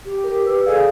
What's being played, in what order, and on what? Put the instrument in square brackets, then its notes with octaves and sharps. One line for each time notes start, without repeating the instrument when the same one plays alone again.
[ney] G4
[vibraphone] A#4
B4 E6
[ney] G#4 [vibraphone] A4 D5 F5